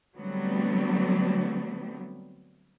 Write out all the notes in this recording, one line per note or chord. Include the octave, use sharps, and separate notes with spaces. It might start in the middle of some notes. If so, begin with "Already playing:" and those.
D3 F#3 G3 A3 B3 C4